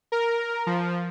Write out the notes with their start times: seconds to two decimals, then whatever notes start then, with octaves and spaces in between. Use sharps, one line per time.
0.12 A#4
0.66 F3